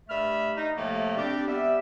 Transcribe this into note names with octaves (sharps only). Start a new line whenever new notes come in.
G2 A3 E5 B5 F6
D#4
A2 C3 F3 A3 A#3
G3 C4 D4 G4
G3 B3 E5